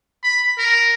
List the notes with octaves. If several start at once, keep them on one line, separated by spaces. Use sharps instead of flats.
B5
A#4